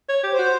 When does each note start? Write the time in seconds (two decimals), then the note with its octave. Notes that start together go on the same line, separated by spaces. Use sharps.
0.09 C#5
0.24 G4
0.33 C5
0.39 F#4